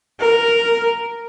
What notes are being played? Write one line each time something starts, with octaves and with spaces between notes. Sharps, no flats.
A#4